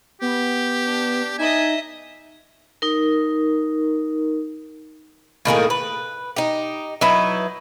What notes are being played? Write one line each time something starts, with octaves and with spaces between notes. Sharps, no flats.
B3 G4
D4
D#4 D#5 E5 G#5
D#4 A#4
A2 D#3 A#3 G#4
B4
D#4 G4
F#3 D#4 E4 B4